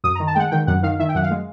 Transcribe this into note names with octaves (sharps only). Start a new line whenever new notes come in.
F#2 D#6
D#3 A#5
A5
G#3 F#5 G5
D#3 G5
F#2 F#5
D#3 F5
D#3 E5
G5
F#2 F#5
F5
G#3